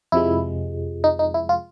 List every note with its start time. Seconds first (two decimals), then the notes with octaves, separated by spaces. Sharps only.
0.12 F2 C3 F3 G#3 E4
1.04 D#4
1.19 D#4
1.34 E4
1.49 F4